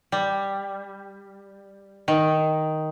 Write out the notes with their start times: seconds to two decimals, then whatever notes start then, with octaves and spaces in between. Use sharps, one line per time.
0.12 G3
2.08 D#3